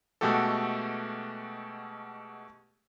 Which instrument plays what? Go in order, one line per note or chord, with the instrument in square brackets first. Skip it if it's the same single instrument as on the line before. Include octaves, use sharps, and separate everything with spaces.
[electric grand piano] B2 G#3 A3 F#4 G4 A4